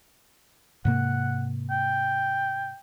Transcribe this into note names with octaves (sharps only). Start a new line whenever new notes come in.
G#2 C3 A#3 F#5
G5